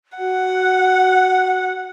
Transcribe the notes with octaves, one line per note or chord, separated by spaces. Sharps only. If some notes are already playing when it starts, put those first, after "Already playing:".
F#4 F#5